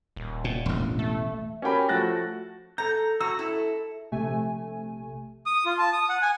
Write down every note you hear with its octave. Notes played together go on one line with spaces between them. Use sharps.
D#1
A#2
E1 A1
A3
C#4 F#4 G4 A#4 G5 B5
F3 A3 F#4 F#6 A6 A#6
A4 A#5 G6
F#4 A#5 E6
E4 A4
A#1 C3 A3 G#5
D#6
F4
A5
D#6
F#5
G#5